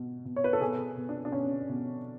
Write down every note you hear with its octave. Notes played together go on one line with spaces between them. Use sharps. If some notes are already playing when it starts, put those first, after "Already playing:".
Already playing: B2
B2
C#5
B4
A4
B2 G#4
B2
D4
D4
B2 C#4
B2